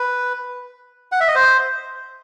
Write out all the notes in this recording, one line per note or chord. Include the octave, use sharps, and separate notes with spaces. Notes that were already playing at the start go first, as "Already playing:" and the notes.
Already playing: B4
F#5
E5
D#5
C5